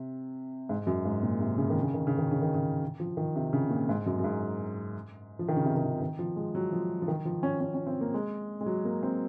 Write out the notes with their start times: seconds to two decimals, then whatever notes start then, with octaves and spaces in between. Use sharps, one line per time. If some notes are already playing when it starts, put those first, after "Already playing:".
Already playing: C3
0.69 G#2
0.87 F#2
1.05 G#2
1.23 A#2
1.40 C3
1.58 C#3
1.70 D#3
1.82 C#3
1.94 D#3
2.07 C#3
2.18 D#3
2.31 C#3
2.42 D#3
2.54 C#3
3.00 F3
3.17 D#3
3.36 C3
3.53 C#3
3.70 A#2
3.89 G#2
4.06 F#2
4.19 F#2
4.24 G#2
5.39 F3
5.48 D#3
5.56 C#3
5.65 C3
5.77 D#3
5.83 C#3
6.02 D#3
6.19 F3
6.36 G#3
6.55 F#3
6.73 F3
7.02 F3
7.08 D#3
7.25 F3
7.43 C#4
7.61 C#4
7.74 C#4
7.87 C4
8.01 A#3
8.14 G#3
8.61 G#3
8.66 F#3
8.85 A#3
9.03 C4